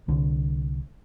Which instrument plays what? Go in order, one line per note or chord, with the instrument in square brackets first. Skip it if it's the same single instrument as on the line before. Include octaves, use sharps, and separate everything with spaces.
[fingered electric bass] C2 D3